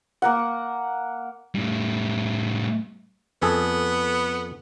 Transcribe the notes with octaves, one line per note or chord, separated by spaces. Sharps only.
A#3 A#4 F#5
A2 G3
F2 B3 G#4 A4